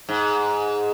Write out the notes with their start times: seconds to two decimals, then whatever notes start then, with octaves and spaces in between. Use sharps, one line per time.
0.09 G#2